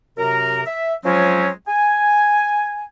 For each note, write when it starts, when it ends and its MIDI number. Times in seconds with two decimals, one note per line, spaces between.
0.17 0.61 42
0.17 0.61 48
0.17 0.61 70
0.66 0.93 76
1.04 1.50 53
1.04 1.50 54
1.04 1.50 56
1.04 1.50 60
1.04 1.50 61
1.68 2.85 80